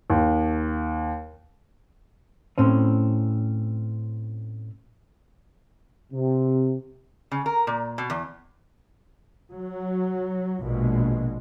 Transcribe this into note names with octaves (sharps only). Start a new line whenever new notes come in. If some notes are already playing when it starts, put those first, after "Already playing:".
D#2
A2 C4 C#4
C3
C#3
A#4
A#2
B2
E2
F#3
A#1 B2 G#3